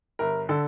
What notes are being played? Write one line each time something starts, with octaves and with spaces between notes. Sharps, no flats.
G1 A#4
D3 A4